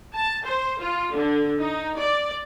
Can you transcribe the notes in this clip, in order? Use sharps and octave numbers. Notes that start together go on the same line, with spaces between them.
A5
C5
F4
D3
D#4
D5